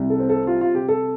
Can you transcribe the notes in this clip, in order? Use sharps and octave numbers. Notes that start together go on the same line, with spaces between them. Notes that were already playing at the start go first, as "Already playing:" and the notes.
Already playing: C2 C3
A4
C4
A4
G3 F4
F4
C3 G4
A4